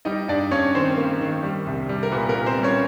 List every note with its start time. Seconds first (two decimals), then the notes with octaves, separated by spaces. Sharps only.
0.05 G3 D#4 D#5
0.28 G2 D4 D5
0.51 G2 C#4 C#5
0.74 D#3 C4 C5
0.98 A#3
1.21 D#3
1.43 G3
1.67 C2
1.89 G3
2.03 A#4
2.12 A#2 B3 B4
2.29 A#3 A#4
2.35 A#2
2.46 C4 C5
2.58 G3
2.63 C#4 C#5